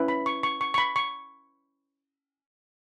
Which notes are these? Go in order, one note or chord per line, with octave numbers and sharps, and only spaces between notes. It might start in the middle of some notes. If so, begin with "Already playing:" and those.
Already playing: C#4 E4 B4
B5
C#6
C#6
C#6
C#6
B5
C#6